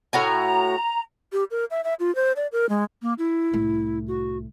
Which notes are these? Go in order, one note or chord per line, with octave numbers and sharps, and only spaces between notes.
A2 F#4 G#5 A#5
G4
A#4
E5
E5
F4
C5
D5
A#4
G#3
A#3
E4
C2 A2
F#4